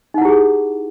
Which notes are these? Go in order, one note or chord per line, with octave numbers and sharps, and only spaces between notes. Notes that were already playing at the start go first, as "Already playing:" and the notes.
D#4 E4 G4 G#4 F#5